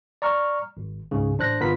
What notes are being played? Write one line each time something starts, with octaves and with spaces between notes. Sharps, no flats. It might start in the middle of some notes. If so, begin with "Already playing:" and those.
D5 A#5 C#6 F6
G#1
C#2 G#2 C#3
A1 D4 C5 F#6 A#6
G1 B3 F4 A#4 B5 B6